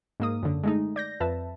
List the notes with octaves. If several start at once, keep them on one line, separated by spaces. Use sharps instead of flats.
G#2 A#3 D#6
F#2 D3
G#3 A3 D#4
D5 G6 A#6
F2 B4 E5 A5